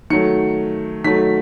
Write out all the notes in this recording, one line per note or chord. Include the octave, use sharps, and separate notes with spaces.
D#3 F#3 A3 C#7
D#3 F#3 A3 B6